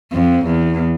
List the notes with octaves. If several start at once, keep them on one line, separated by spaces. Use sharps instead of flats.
F2
E2